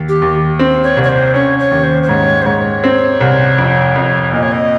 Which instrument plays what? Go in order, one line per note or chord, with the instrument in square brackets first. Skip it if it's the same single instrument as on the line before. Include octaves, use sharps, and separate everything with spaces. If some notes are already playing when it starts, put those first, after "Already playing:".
Already playing: [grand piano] D#2
[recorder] G4
[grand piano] D#2
C4
[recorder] C#5
[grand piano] C2
[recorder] C#5
C5
[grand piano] C#4 [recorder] C#5
[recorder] C#5
[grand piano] D#2
[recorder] C5
C5
[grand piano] G#2 [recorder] C#5
[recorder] C5
[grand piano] G#2 [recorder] C#5
[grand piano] C4
C2
F2
F2
[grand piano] A#2 [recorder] D#5
[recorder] C#5
D#5